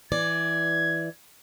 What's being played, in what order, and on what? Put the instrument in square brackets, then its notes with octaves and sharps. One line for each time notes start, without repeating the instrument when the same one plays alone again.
[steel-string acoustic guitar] E3 D5 [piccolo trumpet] G#6